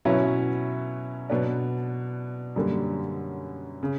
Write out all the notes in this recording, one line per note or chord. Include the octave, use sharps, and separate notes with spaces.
B2 F#3 C#4 E4
B2 F#3 B3 D4
F#2 D3 G3 A#3
C#3